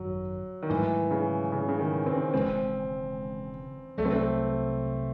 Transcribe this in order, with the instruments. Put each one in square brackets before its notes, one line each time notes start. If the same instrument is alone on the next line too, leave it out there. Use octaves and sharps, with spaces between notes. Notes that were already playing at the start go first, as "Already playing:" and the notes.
Already playing: [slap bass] G#1 F#2 D#3 [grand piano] F#3
[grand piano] D#3
[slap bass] G#2 F#3 A3 [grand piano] E3
[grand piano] C#3
C#3
C#3
D#3
C4
[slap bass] E1 E2 C#3 G#3 [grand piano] C4
[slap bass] C2 C3 F#3 [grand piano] A3
[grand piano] C4
A3